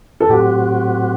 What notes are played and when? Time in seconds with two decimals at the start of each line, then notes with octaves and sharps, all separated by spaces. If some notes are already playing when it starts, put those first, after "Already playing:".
0.20 A4
0.29 A2 F#3 C4 F#4 G4